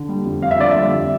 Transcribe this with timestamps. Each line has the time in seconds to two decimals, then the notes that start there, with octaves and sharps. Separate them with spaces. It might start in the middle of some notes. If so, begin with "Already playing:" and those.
Already playing: D3
0.09 G3
0.25 F2
0.42 F2 F5
0.51 E5
0.59 D3 D5
0.71 G3 E5
0.93 F2